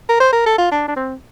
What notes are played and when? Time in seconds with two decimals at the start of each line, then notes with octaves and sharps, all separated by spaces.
0.09 A#4
0.20 C5
0.33 A#4
0.46 A4
0.58 F4
0.72 D4
0.88 D4
0.96 C4